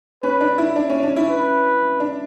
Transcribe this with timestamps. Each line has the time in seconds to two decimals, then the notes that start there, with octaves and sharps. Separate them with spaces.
0.23 C#4 B4
0.41 D4
0.58 E4
0.76 D4
0.90 C#4
1.03 D4
1.16 E4
1.30 B4
2.00 D4